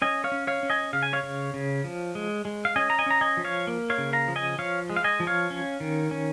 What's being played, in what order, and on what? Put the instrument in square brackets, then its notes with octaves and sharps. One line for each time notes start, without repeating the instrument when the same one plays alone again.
[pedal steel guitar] C#4 D#5 G#5
C#5 F5
C#4
C#5 F5
C#4
D#5 G#5
C#3 F5
G#5
C#5 F5
C#3
C#3
F3
G#3
G#3
F5
C#4 D#5 G#5
A#5
D#5 G#5
C#4 A#5
D#5 G#5
F3
C#5 F5
A#3
C#5 F5
C#3
F5 A#5
F3
D#5 G#5
F3 C#5 F5
G#3
F5
D#5 G#5
F3
C#5 F5
C#4
D#3
C#4